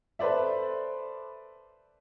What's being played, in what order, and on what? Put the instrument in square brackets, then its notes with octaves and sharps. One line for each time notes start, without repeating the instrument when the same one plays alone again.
[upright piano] A4 B4 C5 D5 E5